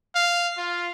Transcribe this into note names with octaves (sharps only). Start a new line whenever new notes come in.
F5
F4